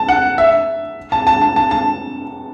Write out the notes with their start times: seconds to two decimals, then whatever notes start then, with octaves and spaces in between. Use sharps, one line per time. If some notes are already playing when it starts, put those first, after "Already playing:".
Already playing: A5
0.09 F#5
0.38 E5
1.12 A5
1.27 A5
1.41 A5
1.56 A5
1.71 A5